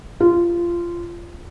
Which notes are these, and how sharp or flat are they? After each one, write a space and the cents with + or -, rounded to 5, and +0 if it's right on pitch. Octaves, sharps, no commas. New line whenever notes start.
F4 -20